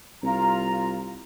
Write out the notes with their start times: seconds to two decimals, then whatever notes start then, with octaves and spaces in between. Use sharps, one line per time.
0.23 C2 F4 A#5